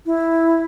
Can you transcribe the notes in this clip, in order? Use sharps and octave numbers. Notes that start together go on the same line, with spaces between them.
E4